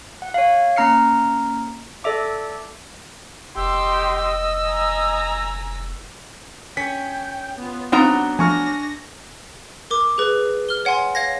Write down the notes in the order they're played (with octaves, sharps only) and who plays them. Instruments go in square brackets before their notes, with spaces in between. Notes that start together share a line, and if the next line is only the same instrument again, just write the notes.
[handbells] F#5
C#5 F5
A#3 C#4 A#5 F6 C7 C#7
A4 D5 E5 D6
[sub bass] F1 [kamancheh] G4 C6 [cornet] D#5 [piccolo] E6
[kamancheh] G#5 A#5
[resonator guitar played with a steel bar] C#4 [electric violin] G5 [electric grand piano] B6
[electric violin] B3 F4
[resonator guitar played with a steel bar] F#3 B3 A#5 [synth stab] C4 D#4 F4 [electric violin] D4 [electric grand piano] F#5
[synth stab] F3 A3 [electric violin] D4 A#6 [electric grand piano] G#5 C#6 F6
[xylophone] A#4 D6
G#4 B4
F6 G7
C#5 F#5 G#5 C6
C#5 F5 G#6 A#6